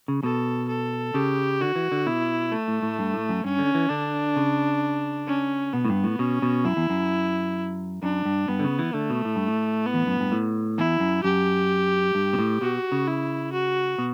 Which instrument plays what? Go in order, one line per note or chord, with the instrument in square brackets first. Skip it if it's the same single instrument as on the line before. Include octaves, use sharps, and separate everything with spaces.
[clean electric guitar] C#3
[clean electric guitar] B2 [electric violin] A4
[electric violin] A4
[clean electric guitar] C#3 [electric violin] G4
[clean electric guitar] D3 [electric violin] F#4
[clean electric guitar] E3
D3
[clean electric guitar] B2 [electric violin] E4
[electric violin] A3
[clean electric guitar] A2
A2
G2
A2
F#2
[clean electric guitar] G2 [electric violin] C#4
[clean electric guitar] D3
E3
[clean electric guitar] D3 [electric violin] D4
[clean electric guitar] C#3
[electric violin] C#4
[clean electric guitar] B2 [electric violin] B3
[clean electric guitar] A2
G2
A2
[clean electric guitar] B2 [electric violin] C#4
[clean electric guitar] B2
[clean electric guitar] F#2 [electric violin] E4
[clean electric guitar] E2
F#2
[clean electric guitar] F#2 [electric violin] D4
[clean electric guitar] G2
[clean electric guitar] G2 [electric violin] B3
[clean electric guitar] D3
C#3
E3
[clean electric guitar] D3 [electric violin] A3
[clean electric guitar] B2
A2
G2
A2
[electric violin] B3
[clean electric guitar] E2
F#2
G2
A2
[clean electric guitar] E2 [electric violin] E4
[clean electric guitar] F#2
[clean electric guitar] F#2 [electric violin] G4
[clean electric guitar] G2
B2
A2
[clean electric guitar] B2 [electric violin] F#4
[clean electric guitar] C#3
[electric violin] E4
F#4
[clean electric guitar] B2